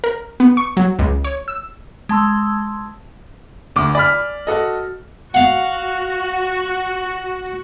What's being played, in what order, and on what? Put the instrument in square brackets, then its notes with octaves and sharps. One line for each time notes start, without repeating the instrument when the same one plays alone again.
[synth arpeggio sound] A#4
B3
C#6
F#3
C#2
C#5
E6
[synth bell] G#3 A5 C6 E6
[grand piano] D2 D6
[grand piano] D5 F6 [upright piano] G#5 B5 B6
[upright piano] F#4 A4 D#5
[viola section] F#4 [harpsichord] F5 F#5